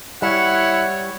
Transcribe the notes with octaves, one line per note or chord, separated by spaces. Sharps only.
G3 E4 C#5 F#5